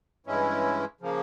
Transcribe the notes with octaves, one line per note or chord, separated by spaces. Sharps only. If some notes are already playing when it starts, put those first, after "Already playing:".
G2 E3 G#3 C#4 E4
C#3 F3 A#3